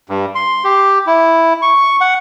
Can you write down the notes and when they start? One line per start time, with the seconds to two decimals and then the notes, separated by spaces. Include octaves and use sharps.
0.09 G2
0.35 C6
0.64 G4
1.07 E4
1.62 C#6
2.01 F#5